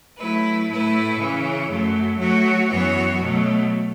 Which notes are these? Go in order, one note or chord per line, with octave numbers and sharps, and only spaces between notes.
F#3 A3 E4 B4
A2 A3 E4 B4
C#3 E3 C#4
F#2 F#3 A3
F#3 A3 F#4 C#5
F#2 E3 B3 F#4 C#5
B2 F#3 A3